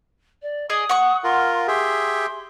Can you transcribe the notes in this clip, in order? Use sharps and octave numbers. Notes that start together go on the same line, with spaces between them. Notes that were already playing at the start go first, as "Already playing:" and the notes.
D5
G#4 D5 D#5 D#6
F#5 C#6
F4 A#4 C6
G4 G#4 E5 C6